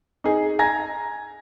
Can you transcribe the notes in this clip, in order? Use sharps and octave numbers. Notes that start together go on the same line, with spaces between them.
D#4 G#4
G#5 A#5 G#6 A#6